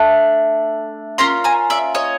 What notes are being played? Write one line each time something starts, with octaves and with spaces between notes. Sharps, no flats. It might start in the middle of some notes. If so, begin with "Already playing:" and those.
Already playing: A3 D4
A#3 C#4 F4 A#5 C6
G#5 A#5
D5 E5
C#5 D#5